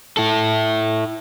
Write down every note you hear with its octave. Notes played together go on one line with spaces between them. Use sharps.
E4 A4